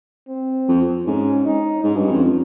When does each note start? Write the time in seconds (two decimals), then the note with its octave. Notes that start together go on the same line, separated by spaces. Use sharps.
0.29 C4
0.68 F2
1.06 G#2 C#4
1.45 D#4
1.84 G#2 C#4
1.96 G2
2.10 F2